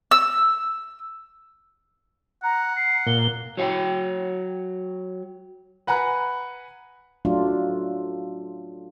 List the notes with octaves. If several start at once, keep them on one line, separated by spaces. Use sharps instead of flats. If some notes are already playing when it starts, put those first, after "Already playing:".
E6
F#5 A#5
C7
A#2 G7
F#3 C#5 F5 G5
B4 F#5 G#5 A#5 B5 F#6
F#3 A3 D4 F4